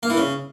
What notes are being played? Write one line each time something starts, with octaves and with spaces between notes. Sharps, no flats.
A#3
E3
C#3